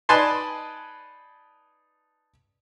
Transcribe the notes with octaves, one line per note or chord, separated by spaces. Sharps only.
D#4 B4 D5 G#5 A5 C6